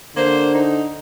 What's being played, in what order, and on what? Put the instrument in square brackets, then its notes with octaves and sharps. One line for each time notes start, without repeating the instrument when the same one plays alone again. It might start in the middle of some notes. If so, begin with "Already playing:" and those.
[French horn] D3 [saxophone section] A#3 C5
[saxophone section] D#4